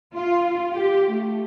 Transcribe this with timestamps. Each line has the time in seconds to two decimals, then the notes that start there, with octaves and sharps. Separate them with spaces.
0.15 F4
0.72 G4
1.11 A3